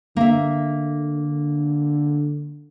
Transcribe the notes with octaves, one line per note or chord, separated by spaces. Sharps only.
D3 A#3 E5